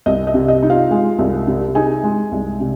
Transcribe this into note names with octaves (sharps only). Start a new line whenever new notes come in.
C2 D#5
D#5
C3
D#5
D#4
F4 F5
G#3
C2
C3
D#4 G#4 G#5
G#3
C2
C3